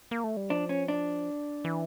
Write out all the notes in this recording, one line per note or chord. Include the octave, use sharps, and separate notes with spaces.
A#3
A3
G3
F3 D4
C#4
D4
E3